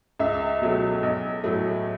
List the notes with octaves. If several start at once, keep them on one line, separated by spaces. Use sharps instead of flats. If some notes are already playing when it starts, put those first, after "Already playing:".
C#2 E5
B2 F#3 A3
B1
A2 F#3 A3